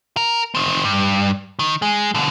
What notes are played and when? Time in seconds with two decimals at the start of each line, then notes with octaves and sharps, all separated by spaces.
0.17 A#4
0.55 D#3 C4
0.85 G2
1.59 D#3
1.82 G#3
2.15 B2 D3